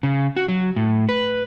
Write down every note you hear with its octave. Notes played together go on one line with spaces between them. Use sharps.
C#3
F#4
F#3
A2
B4